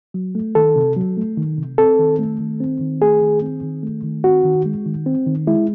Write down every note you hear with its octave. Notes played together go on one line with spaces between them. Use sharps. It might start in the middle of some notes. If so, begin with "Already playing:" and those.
F#3
A3
D#3 A4
C3
F#3
A3
D#3
C3
C4 A4
D#3
A3
D#3
C4
D#3
A3 G#4
D#3
C4
D#3
A3
D#3
C4 F#4
D#3
G#3
D#3
C4
D#3
G#3 E4